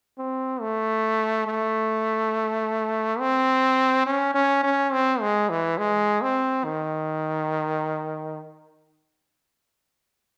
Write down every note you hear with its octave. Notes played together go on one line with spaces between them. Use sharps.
C4
A3
A3
C4
C#4
C#4
C#4
C4
G#3
E3
G#3
C4
D#3